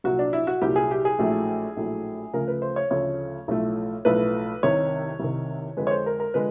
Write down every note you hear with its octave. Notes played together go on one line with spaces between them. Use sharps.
C2 A#2 F#3 F#4
D4
E4
F#4
C2 A#2 F#3 G4
G#4
G4
G#4
A#1 A2 F#3 A3
A#1 A2 F#3 A3
D2 C#3 F3 A3 A#4
B4
C5
C#5
D2 C#3 F3 A3 C#5
B1 A2 F3 A3
B1 A2 F3 A3 B4
C2 C3 D#3 C#5
C2 C3 D#3
F2 D3 F3 G#3 B4
C#5
C5
A#4
A#4
D3 F3 G#3 B4